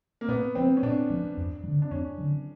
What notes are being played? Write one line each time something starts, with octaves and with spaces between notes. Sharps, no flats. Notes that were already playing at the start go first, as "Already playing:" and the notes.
A#3
A#2 B3
F3 A3 C4 C#4
C#4
A#2 D4
F3 A3 C#4
F2
F#3
D3
D4
F2 C#4
D3 F#3